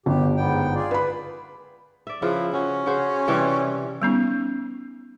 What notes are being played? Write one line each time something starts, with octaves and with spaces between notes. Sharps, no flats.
G1 B2 G4
G#2 B3 G5
F4 G#4 D5
B4 B5
D5 E5
C#3 F3 E4 B4
C#4 F#4
C#3 F#4 C5
C3 E3 G3
G3 B3 C#4 D#4